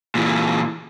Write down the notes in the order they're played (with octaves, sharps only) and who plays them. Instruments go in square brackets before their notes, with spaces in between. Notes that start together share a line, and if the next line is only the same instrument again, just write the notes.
[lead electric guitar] A#2 E3